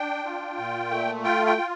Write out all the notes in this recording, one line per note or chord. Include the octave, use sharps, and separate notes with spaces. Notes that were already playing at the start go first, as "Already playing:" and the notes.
Already playing: D4 G5
F4
A#2
A3
F4 G5
G5
F4